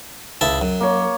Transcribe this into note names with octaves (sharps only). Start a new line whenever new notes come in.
C#2 E4 A5
F#2
A#3 C#5